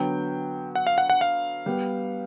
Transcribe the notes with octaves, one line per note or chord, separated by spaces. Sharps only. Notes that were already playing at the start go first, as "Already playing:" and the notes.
Already playing: D3 F#3 B3 G5
F#5
F5
F#5
F#5
F5
G3 B3